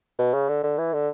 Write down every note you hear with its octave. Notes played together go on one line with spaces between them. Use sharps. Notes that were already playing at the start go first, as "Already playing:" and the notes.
B2
C#3
D3
D3
E3
D3